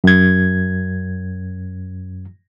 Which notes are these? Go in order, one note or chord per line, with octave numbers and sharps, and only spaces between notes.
F#2 G#6